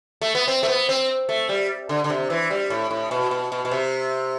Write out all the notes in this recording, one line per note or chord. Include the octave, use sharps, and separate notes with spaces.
A3
B3
C4
A3
B3
C4
A3
G3
D3
D3
C3
E3
G3
A2
A2
B2
B2
B2
B2
C3